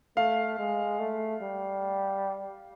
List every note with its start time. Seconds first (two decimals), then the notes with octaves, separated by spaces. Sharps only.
0.17 A3 F5
0.59 G#3
0.99 A3
1.42 G3